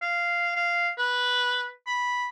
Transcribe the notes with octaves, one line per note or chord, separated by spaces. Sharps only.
F5
F5
B4
B5